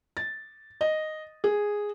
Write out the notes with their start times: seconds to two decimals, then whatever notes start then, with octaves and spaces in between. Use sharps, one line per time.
0.17 A6
0.81 D#5
1.44 G#4